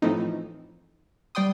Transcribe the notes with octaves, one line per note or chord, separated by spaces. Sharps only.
A2 E3 F3 A3 C4 D#4
G3 D5 G5 C6 D#6